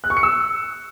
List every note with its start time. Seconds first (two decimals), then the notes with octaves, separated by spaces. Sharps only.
0.04 F#6
0.10 C#6
0.17 C#7
0.23 E6